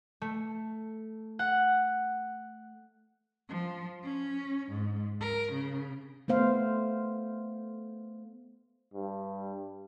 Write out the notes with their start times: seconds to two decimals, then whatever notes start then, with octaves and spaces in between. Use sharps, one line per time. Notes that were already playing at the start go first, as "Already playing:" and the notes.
0.21 A3
1.39 F#5
3.49 F3
4.03 C#4
4.70 G#2
5.21 A#4
5.52 C#3
6.28 A3 B3 C5 F5
8.94 G2